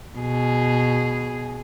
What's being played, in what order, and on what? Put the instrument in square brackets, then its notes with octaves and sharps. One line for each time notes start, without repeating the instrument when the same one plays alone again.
[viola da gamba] B2 G#4